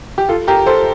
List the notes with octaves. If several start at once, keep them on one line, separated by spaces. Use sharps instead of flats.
G4
F4 A4
G4 A#4
A4 C5